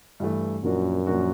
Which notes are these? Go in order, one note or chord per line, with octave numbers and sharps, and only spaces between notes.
G2 E3 A3
F#2 A#2 F3 A#3 D4 F#4
A#2 F3 A#3 D4 F#4